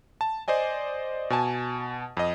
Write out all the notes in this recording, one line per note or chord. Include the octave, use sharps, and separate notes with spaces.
A5
C5 D5 D#5 G#5
B2 G#5 A5
F2 D#5